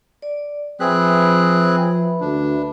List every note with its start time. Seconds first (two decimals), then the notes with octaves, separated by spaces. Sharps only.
0.22 D5
0.80 F3 C4 G#4 B4 E5 B5 F#6
2.21 D2 D4